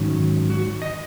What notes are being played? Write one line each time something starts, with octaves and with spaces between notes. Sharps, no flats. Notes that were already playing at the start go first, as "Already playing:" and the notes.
Already playing: G#2 D#3 F#3 C#4
F#4
D#5